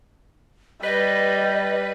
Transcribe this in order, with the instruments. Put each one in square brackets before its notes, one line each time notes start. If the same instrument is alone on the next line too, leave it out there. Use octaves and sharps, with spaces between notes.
[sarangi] G3 [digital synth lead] B4 [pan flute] D#5